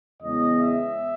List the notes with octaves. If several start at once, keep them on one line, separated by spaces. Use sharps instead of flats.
E2 C#3 G#3 B3 D#5
E5